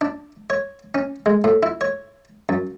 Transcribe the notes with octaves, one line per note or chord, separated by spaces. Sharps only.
D4
C#5
C#4
G#3
A2
E4
C#5
F#2